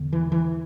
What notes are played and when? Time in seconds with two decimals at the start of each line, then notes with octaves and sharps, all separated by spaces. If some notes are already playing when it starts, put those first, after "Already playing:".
Already playing: E2 D3
0.13 E3
0.32 E3